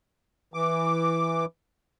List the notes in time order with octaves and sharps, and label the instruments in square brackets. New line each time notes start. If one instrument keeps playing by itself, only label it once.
[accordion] E3 D6